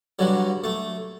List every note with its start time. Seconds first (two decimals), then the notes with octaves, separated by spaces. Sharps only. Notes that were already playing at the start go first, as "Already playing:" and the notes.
0.19 G2 D3 F#3
0.64 A3